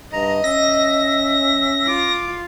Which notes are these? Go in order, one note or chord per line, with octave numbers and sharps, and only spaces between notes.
G2 D#5 A#5
C#4 E5 A#6
F4 D6